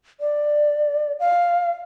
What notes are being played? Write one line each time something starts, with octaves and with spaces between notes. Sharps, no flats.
D5
F5